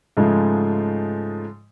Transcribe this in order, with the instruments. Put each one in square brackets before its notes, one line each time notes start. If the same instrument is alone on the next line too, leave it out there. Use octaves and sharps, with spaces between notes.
[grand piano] G#2 C#3 F3 G#3 A3